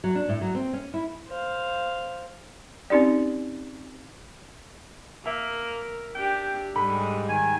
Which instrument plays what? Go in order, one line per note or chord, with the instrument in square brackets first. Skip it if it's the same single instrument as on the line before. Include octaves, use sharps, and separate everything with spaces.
[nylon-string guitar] F#3
D4
A2
F#3
C4
C#4
E4
[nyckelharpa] C5 F5
[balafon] C4 C#4 D#4 G4 D5
[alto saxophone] A#3 [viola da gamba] A#4 [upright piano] E5
[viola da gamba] D4 G4 [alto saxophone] G5
[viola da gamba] G#2 G3 G#3 [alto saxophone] D3 [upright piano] B5
[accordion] D#3 G#5